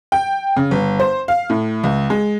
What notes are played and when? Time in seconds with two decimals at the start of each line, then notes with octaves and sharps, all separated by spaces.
0.12 G5
0.56 C#3
0.71 G1
1.00 C5
1.28 F5
1.50 A2
1.84 C#2
2.10 G#3